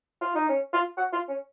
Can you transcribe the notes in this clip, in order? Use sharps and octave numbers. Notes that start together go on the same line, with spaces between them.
F4
D#4
C#4
F4
F#4
F4
C#4